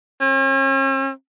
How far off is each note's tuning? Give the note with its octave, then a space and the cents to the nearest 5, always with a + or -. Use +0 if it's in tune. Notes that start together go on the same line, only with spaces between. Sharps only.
C#4 -45